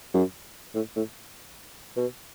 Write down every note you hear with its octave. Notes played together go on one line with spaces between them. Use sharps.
F#2
A2
A2
B2